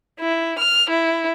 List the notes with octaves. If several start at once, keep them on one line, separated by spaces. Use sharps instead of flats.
E4
F6
E4